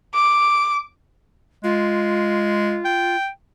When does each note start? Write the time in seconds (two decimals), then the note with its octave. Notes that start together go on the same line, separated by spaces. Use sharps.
0.14 D6
1.64 G#3 F4
2.85 G5